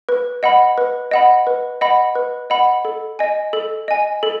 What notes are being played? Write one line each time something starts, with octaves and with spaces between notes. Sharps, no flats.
B4
D#5 F#5 B5
B4
D#5 F#5 B5
B4
D#5 F#5 B5
B4
D#5 F#5 B5
A4
D#5 G#5
A4
D#5 G#5
A4